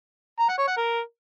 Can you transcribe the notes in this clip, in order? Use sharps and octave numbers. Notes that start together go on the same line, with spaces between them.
A#5
F#5
C#5
F#5
A#4